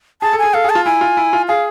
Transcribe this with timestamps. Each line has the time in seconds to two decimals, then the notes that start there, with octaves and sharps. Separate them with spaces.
0.22 G#4 A5
0.33 A4
0.39 G#4 G#5
0.54 A4 F5
0.64 G#4
0.70 A5
0.75 F4
0.85 E4 G#5
1.01 F4
1.17 E4
1.33 F4
1.48 G#4 F5